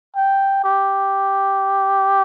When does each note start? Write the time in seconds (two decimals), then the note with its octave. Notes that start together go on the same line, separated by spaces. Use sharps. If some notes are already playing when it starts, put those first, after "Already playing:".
0.16 G5
0.64 G4